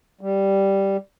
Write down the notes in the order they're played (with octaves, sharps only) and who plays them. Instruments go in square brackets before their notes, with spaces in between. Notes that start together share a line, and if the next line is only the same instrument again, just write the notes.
[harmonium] G3